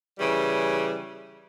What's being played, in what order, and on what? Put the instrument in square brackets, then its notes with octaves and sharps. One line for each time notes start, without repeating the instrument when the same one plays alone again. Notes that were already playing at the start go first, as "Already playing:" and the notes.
[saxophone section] C#3 E3 G3